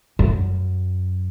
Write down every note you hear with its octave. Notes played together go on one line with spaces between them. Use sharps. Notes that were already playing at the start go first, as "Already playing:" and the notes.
F#2